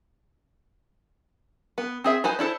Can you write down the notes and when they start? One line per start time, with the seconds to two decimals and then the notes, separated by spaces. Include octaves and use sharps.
1.78 B3
2.04 C4 G#4 E5
2.24 D#4 B4 C5 G#5
2.39 D4 E4 A4 C5